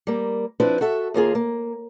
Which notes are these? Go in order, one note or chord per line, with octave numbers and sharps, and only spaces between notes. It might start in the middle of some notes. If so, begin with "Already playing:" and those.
G3 A#3
F3 C4 D4 E4 B4
F#4 A4 E5
D#2 A#3 F4 G#4
A#3